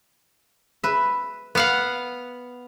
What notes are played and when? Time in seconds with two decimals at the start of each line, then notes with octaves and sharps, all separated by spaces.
0.84 B4 E5
1.55 B3 F5 F#5